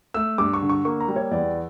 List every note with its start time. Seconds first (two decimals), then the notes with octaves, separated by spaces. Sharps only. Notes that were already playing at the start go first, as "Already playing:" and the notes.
0.14 A3 E6
0.38 G2 D6
0.54 C#6
0.62 D3
0.70 C#6
0.85 A#3 C#6
1.00 A#5
1.08 G3
1.16 C#5
1.31 E2 D5